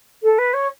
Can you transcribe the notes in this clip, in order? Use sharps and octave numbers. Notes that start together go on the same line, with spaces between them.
A4
B4
C#5